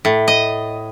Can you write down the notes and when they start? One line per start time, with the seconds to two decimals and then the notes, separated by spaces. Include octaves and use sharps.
0.05 A2
0.28 D#5